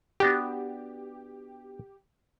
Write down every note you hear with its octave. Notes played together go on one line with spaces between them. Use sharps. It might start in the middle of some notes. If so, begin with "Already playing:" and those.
B3 D4 F#4 G4